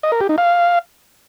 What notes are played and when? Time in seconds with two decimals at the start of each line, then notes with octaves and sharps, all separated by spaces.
0.03 D#5
0.12 A#4
0.21 G4
0.29 D#4
0.38 F5